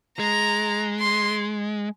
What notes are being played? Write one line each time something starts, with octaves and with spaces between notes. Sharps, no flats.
G#3 A#5
C6